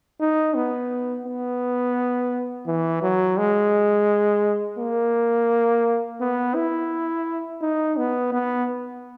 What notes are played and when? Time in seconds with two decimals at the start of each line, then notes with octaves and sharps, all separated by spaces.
0.20 D#4
0.55 B3
1.25 B3
2.67 E3
3.02 F#3
3.37 G#3
4.79 A#3
6.21 B3
6.55 E4
7.62 D#4
7.97 B3
8.33 B3